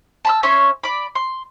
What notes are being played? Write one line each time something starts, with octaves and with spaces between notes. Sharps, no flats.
A5 B5 E6
C#4 C#5 E5 C6
D5 B5
C6